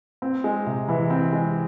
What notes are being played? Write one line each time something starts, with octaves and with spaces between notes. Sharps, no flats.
C4
G#3
C3
E3
C4
G#3